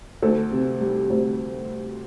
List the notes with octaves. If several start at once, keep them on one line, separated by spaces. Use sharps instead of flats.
D2 A4
C3
G3
D2